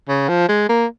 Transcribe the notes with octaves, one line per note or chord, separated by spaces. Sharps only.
C#3
F3
G#3
A#3